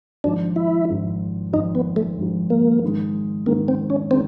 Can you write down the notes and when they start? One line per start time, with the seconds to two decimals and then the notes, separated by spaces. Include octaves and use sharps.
0.24 G#1 G#2 F3 D4
0.56 E4
0.89 G#1 G#2 F3
1.53 G#1 G#2 F3 D#4
1.75 B3
1.96 A3
2.18 G#1 G#2 F3
2.50 A#3
2.83 G#2 D#3 G#3
3.46 G#2 D#3 G#3 A#3
3.68 C4
3.90 C#4
4.11 D#3 G#3 C4